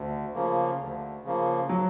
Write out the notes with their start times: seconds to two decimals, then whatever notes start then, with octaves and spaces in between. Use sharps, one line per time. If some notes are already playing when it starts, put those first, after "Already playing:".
Already playing: D2
0.34 C#3 F3 A#3
0.80 D2
1.24 C#3 F3 A#3
1.69 F#3